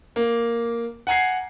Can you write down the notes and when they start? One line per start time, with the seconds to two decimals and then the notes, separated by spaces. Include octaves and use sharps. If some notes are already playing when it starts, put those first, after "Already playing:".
0.16 A#3
1.07 F#5 G#5 A#5 G#6 C7